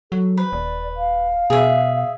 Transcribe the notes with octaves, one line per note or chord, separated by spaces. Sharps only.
F#3 A4
B4 C5
D#1 D5
F5
B2 G#4 E5